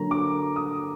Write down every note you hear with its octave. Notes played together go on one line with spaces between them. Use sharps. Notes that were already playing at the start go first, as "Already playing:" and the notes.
Already playing: D3 F#3 A#3 A#5
D6
D#6